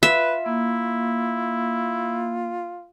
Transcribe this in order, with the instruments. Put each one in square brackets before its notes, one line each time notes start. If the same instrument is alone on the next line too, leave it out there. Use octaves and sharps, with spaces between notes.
[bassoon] F4 [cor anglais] B4 [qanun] E5
[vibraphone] A#3 [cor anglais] E4